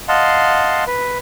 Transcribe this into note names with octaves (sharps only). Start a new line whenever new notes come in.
D#5 F5 F#5 A5 C6
B4